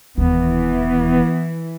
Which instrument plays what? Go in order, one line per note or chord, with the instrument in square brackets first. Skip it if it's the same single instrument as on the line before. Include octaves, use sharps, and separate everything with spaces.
[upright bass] E1 D#2 [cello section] E3 [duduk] B3